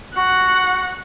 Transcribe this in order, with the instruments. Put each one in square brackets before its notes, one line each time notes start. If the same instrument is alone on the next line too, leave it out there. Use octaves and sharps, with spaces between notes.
[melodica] F#4 [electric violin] F#5